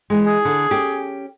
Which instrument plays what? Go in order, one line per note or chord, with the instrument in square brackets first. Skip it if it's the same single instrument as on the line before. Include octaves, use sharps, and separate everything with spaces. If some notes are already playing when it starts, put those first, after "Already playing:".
[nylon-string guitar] E3 G#3
[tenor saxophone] G#4
[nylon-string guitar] D3
C#4 G4